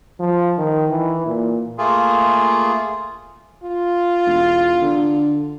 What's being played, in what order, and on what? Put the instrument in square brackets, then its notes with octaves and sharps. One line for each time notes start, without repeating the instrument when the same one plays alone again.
[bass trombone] F3
D#3
E3
A#2
[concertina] A3 A#3 F4 G#4
[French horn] F4
[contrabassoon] E1
D3